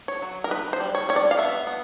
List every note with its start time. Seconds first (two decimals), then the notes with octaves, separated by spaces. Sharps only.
0.08 C#5
0.22 F#3
0.44 A#4
0.51 D#4 B4
0.73 C5
0.80 G3
0.95 C#5
1.09 G3 C#5
1.16 D5
1.31 F5
1.38 B3 E5
1.67 B3